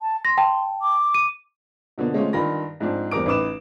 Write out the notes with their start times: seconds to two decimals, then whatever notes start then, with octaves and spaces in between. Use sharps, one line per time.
0.01 A5
0.25 C6 A#6
0.38 G5 A5
0.82 D6
1.15 D#7
1.98 B2 D3 F3 A#3
2.14 G#3 A3 C4 C#4 F4
2.33 G2 D#3 F4 B5 A#6
2.80 G#2 F3 C4 D4
3.11 E2 G3 C4 A#4 D6 D7
3.26 A1 D#4 B4 D6 E7